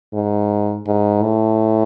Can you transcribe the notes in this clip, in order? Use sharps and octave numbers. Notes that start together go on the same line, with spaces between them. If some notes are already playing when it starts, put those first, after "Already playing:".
G#2
G#2
A2